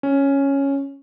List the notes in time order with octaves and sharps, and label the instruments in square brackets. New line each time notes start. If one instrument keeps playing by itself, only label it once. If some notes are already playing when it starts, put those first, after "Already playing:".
[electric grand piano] C#4